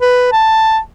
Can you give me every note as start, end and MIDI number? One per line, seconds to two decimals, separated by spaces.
0.01 0.28 71
0.32 0.79 81